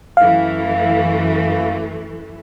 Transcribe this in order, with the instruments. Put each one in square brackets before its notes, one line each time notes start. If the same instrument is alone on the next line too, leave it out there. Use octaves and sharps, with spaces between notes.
[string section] F#2 E3 A3 [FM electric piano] F5